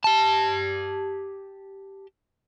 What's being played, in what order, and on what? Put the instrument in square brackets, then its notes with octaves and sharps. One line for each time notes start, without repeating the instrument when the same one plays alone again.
[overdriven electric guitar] G4 A5